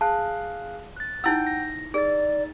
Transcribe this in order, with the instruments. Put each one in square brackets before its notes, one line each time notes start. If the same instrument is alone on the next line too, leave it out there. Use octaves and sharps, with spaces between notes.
[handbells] G#4 F5 F#6 [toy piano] A5
[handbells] F#6 A6
[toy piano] D#4 E4 E6 [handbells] F#5 G5 G6
[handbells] A#6
[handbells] D#4 A6 [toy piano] G#4 [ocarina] D5